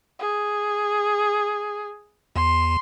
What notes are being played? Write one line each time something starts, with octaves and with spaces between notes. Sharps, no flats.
G#4
E2 C6